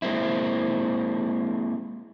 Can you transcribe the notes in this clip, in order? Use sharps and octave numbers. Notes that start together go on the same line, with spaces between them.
G#3 A#3 C4 E4